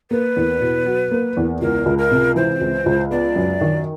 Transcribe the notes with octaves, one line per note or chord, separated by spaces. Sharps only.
A#3 B4
E2
B2
F#3
A#3
E2
C#2 A#4
C#2
A#4
C3
E3 C5
C#2
C#2
B3 D5
F#2
D#3